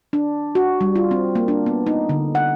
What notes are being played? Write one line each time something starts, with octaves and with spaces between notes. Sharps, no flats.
D4
F#4
G3
F4
C4
A#3
D4
B3
D#4
D3
F#5